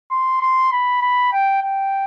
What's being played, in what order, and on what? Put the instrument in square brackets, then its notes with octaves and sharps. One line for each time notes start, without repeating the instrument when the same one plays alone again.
[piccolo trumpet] C6
C6
B5
B5
G5
G5